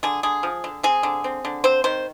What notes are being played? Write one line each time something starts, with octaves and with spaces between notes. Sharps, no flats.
D3 G#4
D3 G#4
F3
D3
C4 G#4
D3
C4
D3
C4 C5
D#3 C5